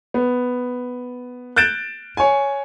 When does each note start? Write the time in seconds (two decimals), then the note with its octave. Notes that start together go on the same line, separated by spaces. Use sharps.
0.14 B3
1.56 F#6 G6 A6 D7 E7
2.17 C#5 G#5